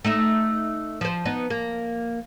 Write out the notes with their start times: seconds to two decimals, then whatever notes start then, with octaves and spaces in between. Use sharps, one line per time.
0.05 A3 D#4 E5
1.01 F3 C5
1.25 B3 D#4
1.50 A#3